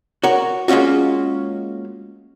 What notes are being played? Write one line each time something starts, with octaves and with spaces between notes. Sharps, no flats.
F#4 A#4 C#5
G#3 A#3 C#4 F4 F#4